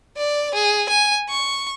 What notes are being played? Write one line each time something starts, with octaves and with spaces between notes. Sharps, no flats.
D5
G#4
G#5
C#6